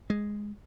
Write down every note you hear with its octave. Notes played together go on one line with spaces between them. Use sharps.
G#3